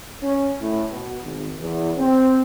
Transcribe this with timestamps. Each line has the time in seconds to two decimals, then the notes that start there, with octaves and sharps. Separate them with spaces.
0.23 C#4
0.61 A2
0.92 B2
1.23 G#1
1.60 E2
1.98 C4